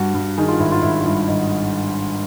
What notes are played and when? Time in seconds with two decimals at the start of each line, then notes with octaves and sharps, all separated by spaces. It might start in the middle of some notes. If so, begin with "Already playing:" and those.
Already playing: G2 F#4
0.14 G2
0.38 D#3 G#4
0.48 F4
0.59 G#1 E4
0.72 F4
0.82 G#1 E4
1.01 F4
1.05 G2 E4
1.28 G#1 D#4